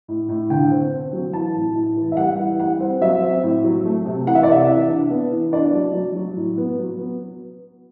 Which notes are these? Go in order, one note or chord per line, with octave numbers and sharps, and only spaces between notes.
A2
A2
D3 G5
C4
C4
F#3
E3 A5
A2
A2
E3
E5
G3 F#5
E3
G3 F#5
C4
F#3 E5
C4
A2
F#3
A3
C3
E3 F#5
E5
D5
C3 E5
E3
D4
B3
E3
D4 D5
F#3
F#3
F#3
A2
B3
F#3
B3